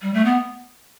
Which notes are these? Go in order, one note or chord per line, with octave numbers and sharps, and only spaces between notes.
G3
A3
B3